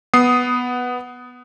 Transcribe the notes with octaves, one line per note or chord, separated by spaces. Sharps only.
B3 D#6 C7